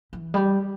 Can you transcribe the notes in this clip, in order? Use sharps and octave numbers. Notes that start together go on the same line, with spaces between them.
E3
G3